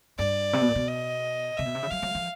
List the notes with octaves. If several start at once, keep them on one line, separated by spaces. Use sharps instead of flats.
G2 D5
C3
B2
A#2
B2
D#5
C3 E5
B2
C3
C#3
F#3 F5
F#3
F3